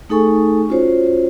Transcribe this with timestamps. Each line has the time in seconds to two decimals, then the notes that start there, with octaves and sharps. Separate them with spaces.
0.10 A3 D#4 G#4 A4 G#5 C#6
0.69 C#4 F4 F#4 C5 C#5